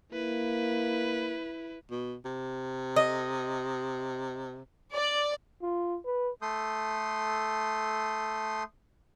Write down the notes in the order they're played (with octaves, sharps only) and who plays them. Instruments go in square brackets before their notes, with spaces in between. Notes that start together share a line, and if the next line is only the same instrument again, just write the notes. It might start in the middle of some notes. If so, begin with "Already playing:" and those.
[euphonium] A#3 [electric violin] E4 B4
[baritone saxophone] B2
C3
[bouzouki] D#5
[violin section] D5
[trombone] F4
B4
[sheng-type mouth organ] A3 A4 C6 D#6 G6